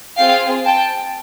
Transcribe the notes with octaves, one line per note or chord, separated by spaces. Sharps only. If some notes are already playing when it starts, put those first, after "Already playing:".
C4 F4 G#4 F5 G5
G5 A5